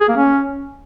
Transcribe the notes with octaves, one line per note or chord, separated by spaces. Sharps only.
G#4
A#3
C#4